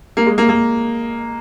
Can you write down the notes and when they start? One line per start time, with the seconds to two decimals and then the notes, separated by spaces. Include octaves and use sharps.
0.17 A#3
0.26 G#3
0.38 A#3
0.49 A#3